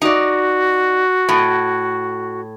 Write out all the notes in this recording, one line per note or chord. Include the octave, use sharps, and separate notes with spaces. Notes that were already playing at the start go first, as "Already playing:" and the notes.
D#4 F#4 D5
A2